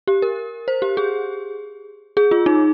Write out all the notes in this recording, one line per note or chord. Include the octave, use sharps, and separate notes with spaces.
G4
A#4
C5
G4
G#4
G#4
F4
D#4